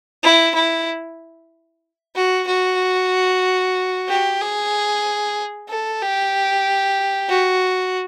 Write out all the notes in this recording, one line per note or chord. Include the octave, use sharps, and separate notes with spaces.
E4
E4
F#4
F#4
G4
G#4
A4
G4
F#4